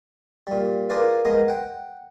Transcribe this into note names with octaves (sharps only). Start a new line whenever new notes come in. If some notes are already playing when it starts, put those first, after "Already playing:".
A#2 G3
F4 G#4 A#4 B4 D5 F5
G#3 B3 A#4 D#5
F#5 G5